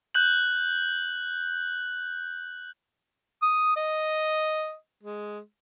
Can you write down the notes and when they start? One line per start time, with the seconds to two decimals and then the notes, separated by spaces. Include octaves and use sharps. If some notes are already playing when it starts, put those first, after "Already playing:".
0.15 F#6 G6 F#7
3.43 D#6
3.76 D#5
5.03 G#3